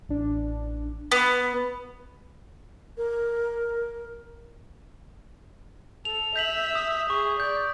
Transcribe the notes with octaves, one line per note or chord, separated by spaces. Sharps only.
A1 D4
B3
A#4
A4 F7
E5 G6 B6 F#7
D#6
G#4 C#6
D5 G6